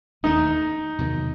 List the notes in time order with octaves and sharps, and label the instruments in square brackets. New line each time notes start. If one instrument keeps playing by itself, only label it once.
[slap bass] E1 D#2 D#3 A3 [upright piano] D#4
[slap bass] E2 C3 D#3 F#3